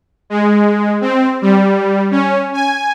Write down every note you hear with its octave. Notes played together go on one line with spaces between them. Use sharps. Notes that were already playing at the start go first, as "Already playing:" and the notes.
G#3
C4
G3
C#4
G#5